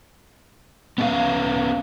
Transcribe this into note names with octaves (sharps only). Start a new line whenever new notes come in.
B3 C#4 D4 E4 B4 F5